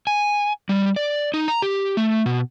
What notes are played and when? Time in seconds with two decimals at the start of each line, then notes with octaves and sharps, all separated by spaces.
0.07 G#5
0.69 G3
0.96 D5
1.34 D#4
1.48 A#5
1.62 G4
1.97 A3
2.26 B2